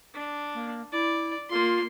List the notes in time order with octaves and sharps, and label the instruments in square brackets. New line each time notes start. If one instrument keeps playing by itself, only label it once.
[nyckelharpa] D4
[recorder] A#3
[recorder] E4 [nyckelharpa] D5
[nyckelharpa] A#3 C6 [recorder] F4